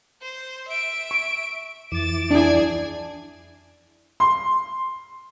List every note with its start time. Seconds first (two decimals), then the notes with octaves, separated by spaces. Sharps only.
0.22 C5
0.68 E5 D7
1.11 C#6
1.92 F2 E3 D6 A6 E7
2.31 D4 E4 G#4 G#5
4.20 C6